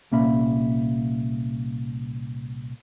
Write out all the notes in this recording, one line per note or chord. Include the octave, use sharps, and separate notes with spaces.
C2 A#2 A#3 C#4 E5 B5